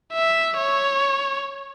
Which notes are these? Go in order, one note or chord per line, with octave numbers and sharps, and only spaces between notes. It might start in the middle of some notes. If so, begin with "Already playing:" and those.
E5
C#5